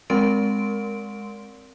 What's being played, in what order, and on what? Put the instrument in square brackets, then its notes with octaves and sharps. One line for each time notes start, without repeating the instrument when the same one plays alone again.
[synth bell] G#3 C4 A#4 C6 D7